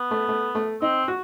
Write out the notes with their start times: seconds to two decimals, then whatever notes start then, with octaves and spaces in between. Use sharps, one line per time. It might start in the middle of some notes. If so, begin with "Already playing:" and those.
Already playing: B3
0.11 A3
0.28 A3
0.55 A3
0.82 C4 D#4
1.08 F#4